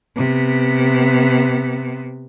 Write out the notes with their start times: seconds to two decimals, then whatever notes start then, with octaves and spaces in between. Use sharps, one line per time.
0.16 C3 B3